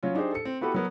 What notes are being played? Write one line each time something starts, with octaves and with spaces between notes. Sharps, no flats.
F#3 C#4 F4
D4 D#4 G4 G#4 C5
A4 C#7
C4
B3 E4 F#4 G4 A4 B4
F#3 B3 A#4